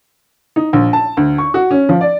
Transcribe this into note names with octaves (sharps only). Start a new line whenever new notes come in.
D#4
A#1
A5
D2
C#6
F#4
C#4
F3
D5